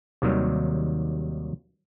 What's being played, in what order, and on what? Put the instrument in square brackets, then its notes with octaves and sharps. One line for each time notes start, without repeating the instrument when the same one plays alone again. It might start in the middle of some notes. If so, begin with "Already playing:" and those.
[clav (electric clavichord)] D#2 C3 D#3 F#3 G3